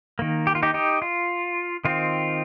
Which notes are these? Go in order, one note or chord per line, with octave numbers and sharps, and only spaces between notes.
D#3 A#3
G4
F4
D#4 G4
D#4 G4
F4
D#3 C4 F4